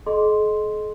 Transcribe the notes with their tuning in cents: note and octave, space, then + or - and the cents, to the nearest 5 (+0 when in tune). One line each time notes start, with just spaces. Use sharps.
G#4 +45 D#5 -10 C6 +0